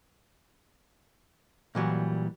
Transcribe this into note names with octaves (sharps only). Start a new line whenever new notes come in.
A#2 E3 F#3 G3